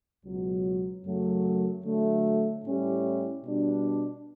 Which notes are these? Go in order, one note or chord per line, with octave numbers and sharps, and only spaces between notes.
C#2 B2 F#3
F#2 C#3 F#3 A3
D3 F#3 A3
A2 G3 C#4 E4 G4
B2 G3 D4